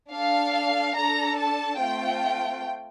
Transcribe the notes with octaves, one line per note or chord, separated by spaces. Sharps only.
D4 A4 F5
D4 A4 A#5
A5
A3 C4 F4 G5